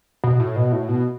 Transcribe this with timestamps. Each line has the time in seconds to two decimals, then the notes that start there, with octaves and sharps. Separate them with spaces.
0.24 B2
0.40 A2
0.56 B2
0.72 A2
0.88 B2